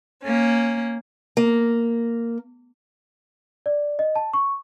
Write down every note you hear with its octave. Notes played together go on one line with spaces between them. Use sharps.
A#3 C#4
A#3
D5
D#5
A5
C#6